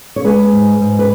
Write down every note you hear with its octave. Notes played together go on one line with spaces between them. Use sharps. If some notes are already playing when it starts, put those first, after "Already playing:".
C#5
G#3 G#4 B4
G#2
G#2
B4